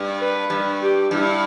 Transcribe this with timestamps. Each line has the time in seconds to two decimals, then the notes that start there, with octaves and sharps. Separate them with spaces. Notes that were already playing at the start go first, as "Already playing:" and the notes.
Already playing: G2
0.19 B4
0.50 G2
0.81 G4
1.11 G2 E4